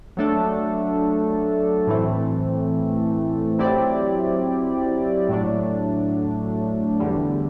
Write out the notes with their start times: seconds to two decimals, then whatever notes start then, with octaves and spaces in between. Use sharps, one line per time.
0.17 F#3 A3 D4 A4
1.87 A2 E3 A3 C4
3.59 F#3 C4 E4 G4 D5
5.29 A2 F#3 A3 D4
7.00 E2 D3 G3